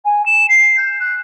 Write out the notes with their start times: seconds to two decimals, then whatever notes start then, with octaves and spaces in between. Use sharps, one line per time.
0.05 G#5
0.25 E7
0.48 C7
0.77 G6
1.00 F#6